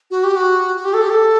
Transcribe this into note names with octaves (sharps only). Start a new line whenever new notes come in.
F#4
G4
F#4
F#4
G4
A4
G4
A4